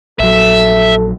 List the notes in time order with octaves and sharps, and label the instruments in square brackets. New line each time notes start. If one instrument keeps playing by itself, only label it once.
[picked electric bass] A#1 F#3 [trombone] A4 [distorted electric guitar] E5